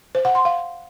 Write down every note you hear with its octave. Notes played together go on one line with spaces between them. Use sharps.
C5
F#5
C6
F5